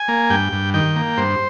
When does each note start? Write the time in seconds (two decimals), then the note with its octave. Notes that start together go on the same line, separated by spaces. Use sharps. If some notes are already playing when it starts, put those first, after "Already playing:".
Already playing: G#5
0.08 A#3
0.30 G2 G5
0.53 G2
0.74 D#3 G5
0.96 A#3
1.17 G2 C5